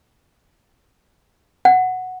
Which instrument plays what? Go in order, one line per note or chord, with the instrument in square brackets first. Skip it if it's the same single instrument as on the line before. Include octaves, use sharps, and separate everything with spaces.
[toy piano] F#5